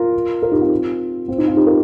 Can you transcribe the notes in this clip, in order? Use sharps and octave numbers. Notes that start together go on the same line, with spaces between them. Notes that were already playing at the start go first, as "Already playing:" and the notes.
Already playing: F4 A#4
F4 A#4
D#4 G4
C4 F4
C4 F4
D#4
C4 F4
D#4 G4
F4 A#4